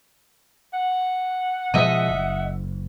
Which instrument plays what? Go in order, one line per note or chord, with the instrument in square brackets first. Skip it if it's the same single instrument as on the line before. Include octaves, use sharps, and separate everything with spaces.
[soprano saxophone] F#5
[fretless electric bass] B2 F3 G#3 [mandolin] D#5 E5
[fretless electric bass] F#1